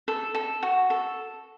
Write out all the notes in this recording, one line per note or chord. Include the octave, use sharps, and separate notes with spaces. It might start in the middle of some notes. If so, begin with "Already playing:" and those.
A4
A4
F#4
A4